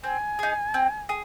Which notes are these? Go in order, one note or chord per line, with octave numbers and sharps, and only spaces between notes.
C4 G#5
D#4 G#4
C4
G#4